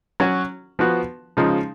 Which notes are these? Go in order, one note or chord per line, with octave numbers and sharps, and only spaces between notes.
F#3 C#4 F#4
F3 B3 F#4
C#3 F3 G#3 D#4